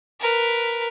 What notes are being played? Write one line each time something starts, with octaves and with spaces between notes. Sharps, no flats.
A#4 B4